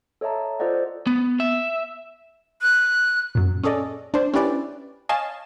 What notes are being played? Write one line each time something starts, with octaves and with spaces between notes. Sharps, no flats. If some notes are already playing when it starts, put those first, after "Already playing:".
A4 C#5 D#5 E5 A5 A#5
F4 A4 C5 D5 D#5 F#5
B3
E5
F#6
F#2 A#2
C#4 G#4 A4 D5 D#5
D4 C5
C#4 D4 E4 G4 B4 D5
C#5 D#5 F5 G#5 A5